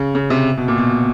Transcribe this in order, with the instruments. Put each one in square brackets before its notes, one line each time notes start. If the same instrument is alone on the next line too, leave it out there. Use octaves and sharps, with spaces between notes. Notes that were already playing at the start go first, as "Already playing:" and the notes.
Already playing: [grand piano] C#3
C#3
C3
B2
A#2
B2